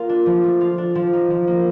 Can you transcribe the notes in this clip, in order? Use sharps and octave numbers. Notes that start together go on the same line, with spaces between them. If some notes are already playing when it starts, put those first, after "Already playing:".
Already playing: A#3 F4
D4
F3
A3
F4
D4
F3
D#4
F3
A#3